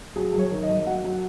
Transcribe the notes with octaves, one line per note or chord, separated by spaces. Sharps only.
F#3 G#4
F#2
C#5
D#3
D#5
F#2
F#3 F#5
F#3